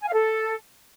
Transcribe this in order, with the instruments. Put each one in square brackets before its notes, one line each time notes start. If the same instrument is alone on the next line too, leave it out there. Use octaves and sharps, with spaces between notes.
[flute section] G#5
F5
A4